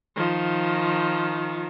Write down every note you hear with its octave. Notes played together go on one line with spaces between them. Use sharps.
D#3 F3